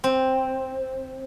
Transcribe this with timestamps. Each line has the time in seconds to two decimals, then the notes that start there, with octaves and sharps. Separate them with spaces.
0.04 C4